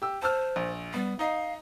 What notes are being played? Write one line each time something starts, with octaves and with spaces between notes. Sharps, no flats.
G4 E6
C5 A5 E6 F6
A#1
G3 B3
D#4 D#5 F5